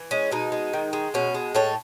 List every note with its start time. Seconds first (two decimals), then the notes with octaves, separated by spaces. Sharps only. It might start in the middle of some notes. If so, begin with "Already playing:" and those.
Already playing: E3
0.11 G#3 C#4
0.31 B2 D#4
0.52 G#3
0.73 D#3
0.93 G#3
1.14 B2 C#4
1.35 G#3
1.55 A2 A4 C#5